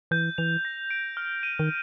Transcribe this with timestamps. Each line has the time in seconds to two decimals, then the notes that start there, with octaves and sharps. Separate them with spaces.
0.11 E3 G6
0.38 E3 F7
0.65 A#6
0.91 D7
1.17 F6
1.43 D#7
1.59 D#3